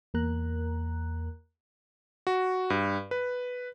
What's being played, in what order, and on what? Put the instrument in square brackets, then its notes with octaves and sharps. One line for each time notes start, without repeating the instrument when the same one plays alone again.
[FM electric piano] E2 A#3 A#4 A#5 F#6
[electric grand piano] F#4
G2
B4